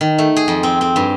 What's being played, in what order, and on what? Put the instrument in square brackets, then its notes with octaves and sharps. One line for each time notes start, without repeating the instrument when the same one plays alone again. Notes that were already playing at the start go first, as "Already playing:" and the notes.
[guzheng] D#3
A3
G#4
F2
C4
C4
G2